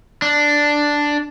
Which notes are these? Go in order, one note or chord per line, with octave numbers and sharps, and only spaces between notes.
D4